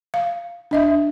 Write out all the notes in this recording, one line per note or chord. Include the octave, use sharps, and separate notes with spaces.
F5
D4 D#5 E5